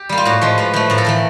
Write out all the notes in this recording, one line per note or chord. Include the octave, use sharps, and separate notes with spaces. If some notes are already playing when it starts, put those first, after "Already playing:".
Already playing: G4
G3 A#3
F4
A2 F#4
F3 G#3
A2 B4
F3 A3
A2 A#4
A4
E3 A3 A#4